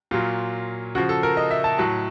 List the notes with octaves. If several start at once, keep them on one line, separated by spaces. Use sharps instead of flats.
A#2 F#3 F4
C#3 F3 F#4
A4
A#4
D#5
E5
A5
A2 F#3 A5